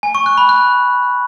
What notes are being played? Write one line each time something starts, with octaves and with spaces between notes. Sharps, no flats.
G#5
C#6
F#6
B5
F#6